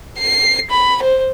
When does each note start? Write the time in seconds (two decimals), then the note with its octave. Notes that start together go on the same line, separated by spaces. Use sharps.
0.19 C7
0.70 B5
1.02 C5